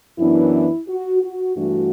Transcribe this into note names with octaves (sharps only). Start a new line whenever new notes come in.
F#2 E3 B3 D4 E4
F#4
F#4
G2 E3 A3 D4 F#4